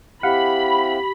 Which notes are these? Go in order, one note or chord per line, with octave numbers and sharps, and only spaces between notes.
C4 E4 G4 F5 F#5 B5